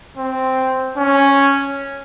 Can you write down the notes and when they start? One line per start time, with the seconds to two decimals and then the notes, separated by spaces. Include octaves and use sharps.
0.18 C4
0.97 C#4